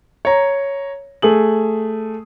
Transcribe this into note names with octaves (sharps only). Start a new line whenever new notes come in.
C#5 A#5
A3 G#4 F#7